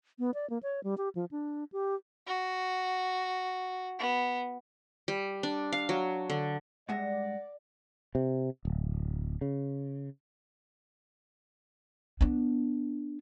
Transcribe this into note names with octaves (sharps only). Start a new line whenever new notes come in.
B3
D5
A#3
C#5
G3
G4
F3
D4
G4
F#4
B3
G3
D4
F5
F#3
D3
G2 G#3 D5 E5 F#5 A#6
C3
D1
C#3
B3 D4